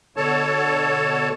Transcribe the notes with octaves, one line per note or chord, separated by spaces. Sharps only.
B2 D3 A4 C#5 A5